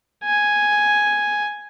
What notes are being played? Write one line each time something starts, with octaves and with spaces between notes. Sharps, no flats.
G#5